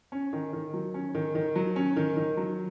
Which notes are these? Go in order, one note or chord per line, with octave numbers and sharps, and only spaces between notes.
C#4
D#3
D#3
F#3
C#4
D#3
D#3
F#3
C#4
D#3
D#3
F#3